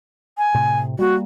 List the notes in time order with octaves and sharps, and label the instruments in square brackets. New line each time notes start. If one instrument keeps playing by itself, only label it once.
[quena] G#5
[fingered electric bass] A2 C3
[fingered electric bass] G3 A#3 [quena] F#4